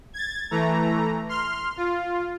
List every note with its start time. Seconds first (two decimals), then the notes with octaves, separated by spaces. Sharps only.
0.13 G#6 A6
0.51 E3 A3 A#5
1.29 C6 F6
1.77 F4